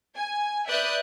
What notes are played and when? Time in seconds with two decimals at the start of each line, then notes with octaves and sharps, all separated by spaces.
0.16 G#5
0.67 B4 D5 E5 D#6 F#6 G6